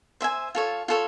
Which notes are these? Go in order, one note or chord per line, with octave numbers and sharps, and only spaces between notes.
C5 E5 G#5
F4 A4 C#5
F4 A4 C#5